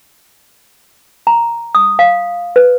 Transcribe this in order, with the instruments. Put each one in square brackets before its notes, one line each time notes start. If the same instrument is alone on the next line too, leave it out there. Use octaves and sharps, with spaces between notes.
[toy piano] A#5
D#6
F5
B4